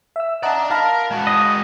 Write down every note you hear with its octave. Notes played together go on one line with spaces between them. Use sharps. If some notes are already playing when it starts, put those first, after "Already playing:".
E5 E6
D5 D#5 F#5 A5 A#5
A#4 F5 A5 B5
G#3 F#4
D#5